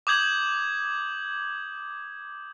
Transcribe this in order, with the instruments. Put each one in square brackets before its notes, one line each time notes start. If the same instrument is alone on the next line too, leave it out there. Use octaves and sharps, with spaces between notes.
[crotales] D6 D#6 G6 G#6 F#7